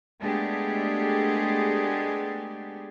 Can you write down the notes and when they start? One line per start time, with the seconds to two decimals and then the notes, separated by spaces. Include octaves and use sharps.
0.21 G#3 A3 B3 D4 G4 G#4